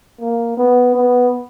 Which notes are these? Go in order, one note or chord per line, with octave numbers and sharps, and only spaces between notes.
A#3
B3
B3